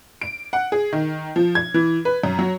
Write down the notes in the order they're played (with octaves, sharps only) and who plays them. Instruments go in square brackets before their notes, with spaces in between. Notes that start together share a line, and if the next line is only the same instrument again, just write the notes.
[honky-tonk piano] D7
F#5
G#4
D#3
F3
G#6
E3
B4
F#2
F#3